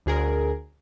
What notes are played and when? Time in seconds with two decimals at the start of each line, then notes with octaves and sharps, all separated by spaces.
0.06 D2 G#4 A#4